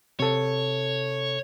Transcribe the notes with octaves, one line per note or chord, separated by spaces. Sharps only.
C3 A4 C#5